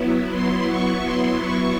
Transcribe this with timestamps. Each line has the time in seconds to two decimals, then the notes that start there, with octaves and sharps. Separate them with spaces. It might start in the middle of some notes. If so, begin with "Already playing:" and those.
Already playing: F#3 B3 E4
0.32 C6
0.68 C#6
1.04 C6
1.40 C#6